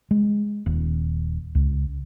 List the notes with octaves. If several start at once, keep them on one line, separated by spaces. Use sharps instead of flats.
G#3
D#1
C#2